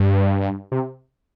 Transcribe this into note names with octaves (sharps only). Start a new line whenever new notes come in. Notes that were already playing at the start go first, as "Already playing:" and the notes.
Already playing: G2
C3